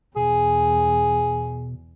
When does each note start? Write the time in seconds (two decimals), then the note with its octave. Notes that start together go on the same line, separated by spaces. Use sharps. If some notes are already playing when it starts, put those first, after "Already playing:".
0.16 E2 B2 G#4